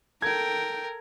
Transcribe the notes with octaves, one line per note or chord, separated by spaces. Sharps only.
A4 A#4 G5 G#6